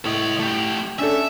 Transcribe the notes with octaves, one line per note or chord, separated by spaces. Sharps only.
A2 C#5 D#5
A3 G4
C#4 D4 A4 E5